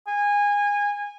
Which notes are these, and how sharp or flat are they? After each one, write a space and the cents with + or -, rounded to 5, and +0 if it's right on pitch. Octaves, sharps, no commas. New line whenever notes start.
G#5 -20